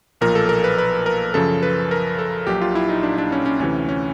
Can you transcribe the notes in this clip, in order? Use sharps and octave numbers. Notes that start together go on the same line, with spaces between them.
B1 A#2 F3 A#4
A4
A#4
B4
B4
A#4
F#2 C#3 F3 A4
B4
A#4
A4
A#1 A#2 F#3 G4
F4
E4
D#4
D4
D4
C#4
C#4
D2 C3 E3 C#4
C#4